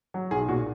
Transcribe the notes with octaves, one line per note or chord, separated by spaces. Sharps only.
F#3
B1 G#4
A#2 F#4